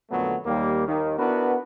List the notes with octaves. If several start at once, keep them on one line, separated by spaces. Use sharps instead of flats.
F2 A#2 D3 F#3 A3 B3
D#2 G3 A#3
D#2 D#3
B3 D4 E4 F#4 A#4 B4